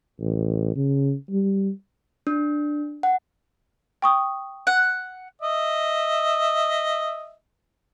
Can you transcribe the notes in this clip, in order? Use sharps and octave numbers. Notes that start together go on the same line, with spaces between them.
A1
C#3
G3
D4
F#5
G5 C#6 D#6
F#5
D#5 E5